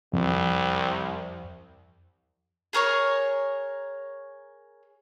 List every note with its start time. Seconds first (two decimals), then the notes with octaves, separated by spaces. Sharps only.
0.13 C2 F2
2.73 G#4 A#4 C#5 C#6